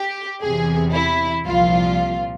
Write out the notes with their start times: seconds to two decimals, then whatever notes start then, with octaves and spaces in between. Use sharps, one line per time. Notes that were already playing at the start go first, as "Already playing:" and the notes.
Already playing: G4
0.43 E2 C3 E3 G#4
0.94 E4
1.45 C2 A#2 F3 F4